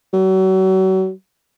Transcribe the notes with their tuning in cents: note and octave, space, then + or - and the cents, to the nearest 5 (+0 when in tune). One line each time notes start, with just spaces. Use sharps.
F#3 +35